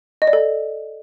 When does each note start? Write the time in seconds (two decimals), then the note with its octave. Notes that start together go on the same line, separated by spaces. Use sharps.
0.22 D#5
0.27 D5
0.33 A4